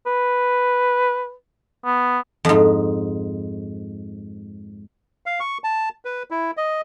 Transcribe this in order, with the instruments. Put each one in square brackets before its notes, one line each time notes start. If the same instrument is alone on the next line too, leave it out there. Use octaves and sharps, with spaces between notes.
[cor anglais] B4
B3
[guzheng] F2 G#2
[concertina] F5
C#6
A5
B4
E4
D#5